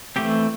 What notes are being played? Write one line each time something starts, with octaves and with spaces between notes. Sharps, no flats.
E3 A3 C4 G4